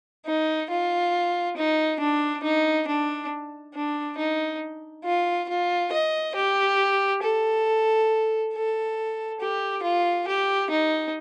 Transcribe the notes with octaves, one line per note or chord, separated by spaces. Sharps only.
D#4
F4
D#4
D4
D#4
D4
D4
D#4
F4
F4
D#5
G4
A4
A4
G4
F4
G4
D#4